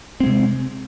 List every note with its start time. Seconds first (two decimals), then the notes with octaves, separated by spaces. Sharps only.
0.20 C4
0.23 G#3
0.26 C3